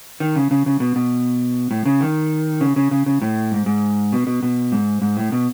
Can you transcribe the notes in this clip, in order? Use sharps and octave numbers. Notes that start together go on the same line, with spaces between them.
D#3
C#3
C#3
C#3
B2
B2
A2
C#3
D#3
C#3
C#3
C#3
C#3
A2
G#2
G#2
B2
B2
B2
G#2
G#2
A2
B2